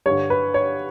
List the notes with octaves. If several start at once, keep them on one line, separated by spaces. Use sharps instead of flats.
G2 D3 C#5
B4
C#5